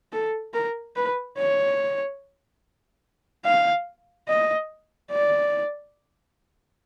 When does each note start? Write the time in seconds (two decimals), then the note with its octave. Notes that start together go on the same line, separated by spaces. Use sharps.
0.12 A4
0.54 A#4
0.96 B4
1.37 C#5
3.45 F5
4.28 D#5
5.11 D5